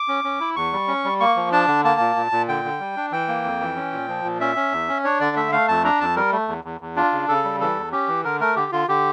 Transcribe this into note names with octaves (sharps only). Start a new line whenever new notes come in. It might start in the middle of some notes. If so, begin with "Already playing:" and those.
Already playing: D6
C#4
C#4
E4
E2 C#6
G3
C#4
G3
A#3 C#6
F3
D4 A5
D3
A#3 A5
A#2
A#2
A#2
D3 G5
D3
G3
D4
E3 G5
A#3
F2
E3
C#4
A#2
F3
A#2
C#4 E5
C#4
E2
C#4
D4 C#5
D3 D5
A3 E5
A3 F5
F2 A5
D4 A#5
F2 A5
G3 A#4
A3
E2
E2
E2
D4 F4
C#3
C#3 A4
G3
E3 A4
E2
C#4 G4
E3
D3 A#4
A3 A#4
D3 G4
D3 F4
D3 G4